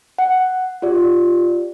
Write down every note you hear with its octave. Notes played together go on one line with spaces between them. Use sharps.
F#5
F4 G4 D5